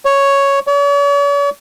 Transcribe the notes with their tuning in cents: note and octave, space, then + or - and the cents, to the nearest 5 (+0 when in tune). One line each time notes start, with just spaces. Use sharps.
C#5 +0
C#5 +45